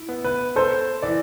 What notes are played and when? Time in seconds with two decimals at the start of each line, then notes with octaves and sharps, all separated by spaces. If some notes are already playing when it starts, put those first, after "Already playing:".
Already playing: E4
0.09 B3
0.24 B4
0.56 A4 C5
1.02 E3 D5